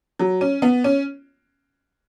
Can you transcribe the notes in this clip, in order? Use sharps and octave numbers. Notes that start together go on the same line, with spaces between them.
F#3
C#4
B3
C#4